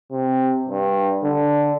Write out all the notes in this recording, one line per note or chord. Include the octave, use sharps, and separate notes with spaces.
C3
G2
D3